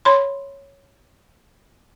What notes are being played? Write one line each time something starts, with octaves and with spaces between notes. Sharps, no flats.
C#5 B5 C6